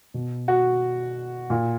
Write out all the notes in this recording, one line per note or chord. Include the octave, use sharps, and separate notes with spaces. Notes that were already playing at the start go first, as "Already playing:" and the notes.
B2
F#4
A#2